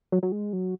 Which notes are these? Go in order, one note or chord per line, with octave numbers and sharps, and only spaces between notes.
F#3
F#3
G#3
F#3